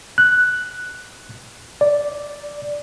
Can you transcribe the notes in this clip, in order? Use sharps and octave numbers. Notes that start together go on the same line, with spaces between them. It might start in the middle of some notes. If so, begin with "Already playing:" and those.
F#6
D5